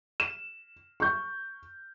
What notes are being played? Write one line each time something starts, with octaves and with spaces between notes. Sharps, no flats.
E7
C#6 G6